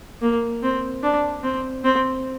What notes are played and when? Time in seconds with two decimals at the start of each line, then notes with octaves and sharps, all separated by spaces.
0.21 A#3
0.63 C4
1.03 D4
1.43 C4
1.84 C4